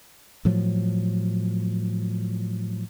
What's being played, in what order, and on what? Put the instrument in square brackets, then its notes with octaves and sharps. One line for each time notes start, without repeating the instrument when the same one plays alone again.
[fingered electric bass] A2 F3 F#3